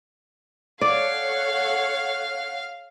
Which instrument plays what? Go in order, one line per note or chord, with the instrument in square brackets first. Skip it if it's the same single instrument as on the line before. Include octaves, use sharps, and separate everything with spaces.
[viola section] A4 C#5 F#5 [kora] D5 [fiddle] F5